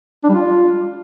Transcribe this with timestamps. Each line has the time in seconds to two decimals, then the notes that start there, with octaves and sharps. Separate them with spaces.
0.24 D4
0.29 G3
0.34 F4